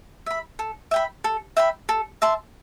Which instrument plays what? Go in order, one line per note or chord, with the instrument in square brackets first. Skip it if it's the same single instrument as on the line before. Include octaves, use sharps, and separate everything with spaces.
[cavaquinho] E5 B5
A4
E5 G5 B5
A4
E5 G5 B5
A4
E5 A5 C6